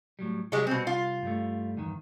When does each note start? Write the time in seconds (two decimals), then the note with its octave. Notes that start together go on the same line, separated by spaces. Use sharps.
0.19 A2 F#3 G3
0.52 C2 F#3 G#3 G4
0.67 B2 C4
0.87 F4
1.23 G2 G3 A3
1.77 E2 G2 D#3